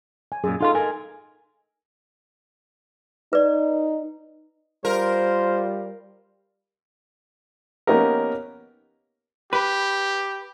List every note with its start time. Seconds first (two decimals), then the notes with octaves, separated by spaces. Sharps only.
0.32 G#5
0.44 F#2 A#2 G#4
0.61 D#4 F4 A4 F5 C6
0.75 A#4 G#5
3.33 D#4 B4 D5
4.85 G3 F4 A#4 C5
7.87 A#3 B3 C#4 D#4 G4 A#4
9.53 G4 B4